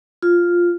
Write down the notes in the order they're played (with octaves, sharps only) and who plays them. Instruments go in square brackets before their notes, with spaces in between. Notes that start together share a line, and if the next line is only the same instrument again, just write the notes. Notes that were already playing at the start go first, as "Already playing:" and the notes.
[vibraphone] F4